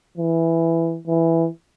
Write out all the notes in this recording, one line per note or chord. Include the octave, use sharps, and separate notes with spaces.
E3
E3